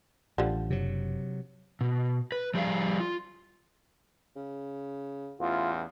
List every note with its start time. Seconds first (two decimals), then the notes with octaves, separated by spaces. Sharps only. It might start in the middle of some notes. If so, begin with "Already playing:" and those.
0.38 A1 D3 F3 G3
0.70 F#1 C3 F#3
1.81 B2
2.32 B4
2.54 F3 G3 G#4 D5 F5
3.00 F4
4.36 C#3
5.40 A1 E2 F4